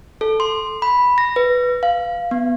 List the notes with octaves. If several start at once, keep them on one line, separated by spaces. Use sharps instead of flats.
A4
C6
B5
A#6
B4
F5
B3